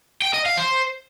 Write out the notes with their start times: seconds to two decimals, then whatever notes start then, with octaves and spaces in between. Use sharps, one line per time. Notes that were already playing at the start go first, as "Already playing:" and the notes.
0.22 G5
0.34 D#5
0.46 F5
0.57 C5